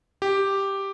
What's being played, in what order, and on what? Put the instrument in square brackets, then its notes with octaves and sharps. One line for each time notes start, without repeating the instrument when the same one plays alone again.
[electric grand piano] G4